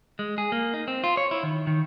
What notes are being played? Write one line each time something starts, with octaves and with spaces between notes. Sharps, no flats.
G#3
G#4
A#3
D#4
C4
F4
C#5
E4
D#3
D#3